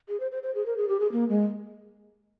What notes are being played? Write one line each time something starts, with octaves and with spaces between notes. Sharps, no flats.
G#4
C5
C5
C5
G#4
A#4
G#4
G4
G#4
A#3
G#3